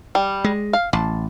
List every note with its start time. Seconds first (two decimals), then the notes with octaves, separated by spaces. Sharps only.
0.15 G3
0.44 G#3
0.73 F5
0.93 A1 A5